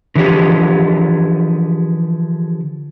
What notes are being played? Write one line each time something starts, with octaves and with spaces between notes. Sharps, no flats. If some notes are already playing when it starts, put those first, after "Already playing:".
D3 E3 F3 G4 G#4